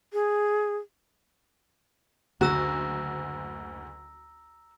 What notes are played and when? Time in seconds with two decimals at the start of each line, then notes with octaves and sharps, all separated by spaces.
0.13 G#4
2.41 F#1 D2 D3 F#4 A#5 E6 A#6